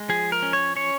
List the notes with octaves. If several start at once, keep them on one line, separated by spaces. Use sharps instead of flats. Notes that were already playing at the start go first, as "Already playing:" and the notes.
Already playing: G#3
F3 G#4
A#4
C#4
C#5
C#4 C#5